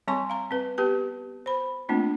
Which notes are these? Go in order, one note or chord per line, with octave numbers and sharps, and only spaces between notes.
G3 C4 C#5 G#5 C6 C#6
F5 A#5
C4 B4
B3 G4 B4 A5
C5 B5
A3 A#3 C4 D4 F4